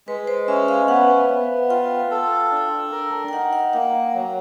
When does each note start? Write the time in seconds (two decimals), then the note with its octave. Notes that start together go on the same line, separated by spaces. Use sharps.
0.07 G#3 B4
0.27 C5
0.48 C#4 E5
0.68 F5
0.88 B3 F#5
1.29 B3
1.70 F4 G5
2.11 A4
2.52 D4
2.92 A#4
3.28 G5
3.33 D#4 F#5
3.53 F#5
3.73 A#3 F#5
4.14 F#3